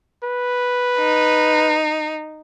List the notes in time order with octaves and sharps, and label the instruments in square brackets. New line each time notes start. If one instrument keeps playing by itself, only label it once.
[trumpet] B4
[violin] D#4